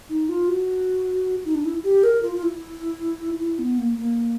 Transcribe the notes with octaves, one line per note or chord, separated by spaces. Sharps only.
D#4
F4
F#4
D#4
D4
E4
G4
A#4
F4
F4
E4
E4
B3
A#3
A#3